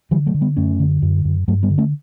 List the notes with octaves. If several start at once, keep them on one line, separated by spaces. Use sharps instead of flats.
D3 E3 G3
F#3 A3
D3
G3 B3
F#2 A3 C#4
D3
F#2
F#2
G2 F#3 A3
G3 B3
D3
A3 C#4